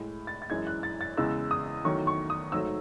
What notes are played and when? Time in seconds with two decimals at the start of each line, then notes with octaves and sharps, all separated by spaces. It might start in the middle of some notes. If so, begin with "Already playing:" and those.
Already playing: A2 G#3
0.27 A6
0.42 A6
0.50 F#2 E3 G#3 G#6
0.67 F#6
0.83 A6
1.01 A6
1.17 E2 C#3 E3 G#3 E6
1.51 D#6
1.85 E2 D#3 F#3 A3 C#6
2.07 C#6
2.30 D#6
2.52 G#2 F#3 A3 E6